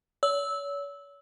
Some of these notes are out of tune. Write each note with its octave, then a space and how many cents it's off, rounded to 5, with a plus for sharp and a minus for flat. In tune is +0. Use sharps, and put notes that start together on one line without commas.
C#5 +40 E6 -15